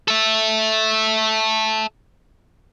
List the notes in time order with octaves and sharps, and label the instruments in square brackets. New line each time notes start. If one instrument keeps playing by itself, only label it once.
[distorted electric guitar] A4 E5